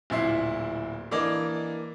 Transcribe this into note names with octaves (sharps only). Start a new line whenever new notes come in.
D1 A#2 E4 C7
E3 A#3 D4 D5 D#5